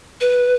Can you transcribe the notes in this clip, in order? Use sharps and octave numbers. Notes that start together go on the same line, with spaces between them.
B4